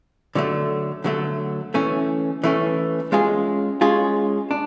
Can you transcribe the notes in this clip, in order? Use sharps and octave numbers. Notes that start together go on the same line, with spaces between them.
D3 F#3 A3
D3 F#3 A3
E3 A3 C#4
E3 A3 C#4
G#3 C#4 F4 G#4
G#3 C#4 F4 G#4
D4